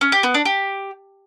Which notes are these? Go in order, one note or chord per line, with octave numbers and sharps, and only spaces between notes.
C#4
G4
B3
D4
G4